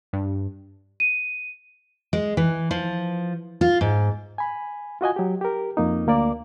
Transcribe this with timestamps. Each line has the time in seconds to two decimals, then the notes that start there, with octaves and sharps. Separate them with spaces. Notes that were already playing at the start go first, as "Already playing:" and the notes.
0.13 G2
1.00 D#7
2.13 G#3
2.37 E3
2.71 F3
3.61 F4
3.81 G#2
4.38 G#5 B5
5.01 F4 F#4 D#5 G#5
5.16 F#3 G4
5.41 G4 A#4
5.77 F2 A#3 D#4
6.07 D2 A#3 A#4 D5